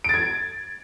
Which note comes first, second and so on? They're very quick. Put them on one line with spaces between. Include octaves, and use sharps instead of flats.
D7 A6 G#6